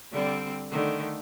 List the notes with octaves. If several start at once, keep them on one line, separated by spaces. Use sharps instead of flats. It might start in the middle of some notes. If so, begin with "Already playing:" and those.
D3 G3 C4
D3 D#3 A3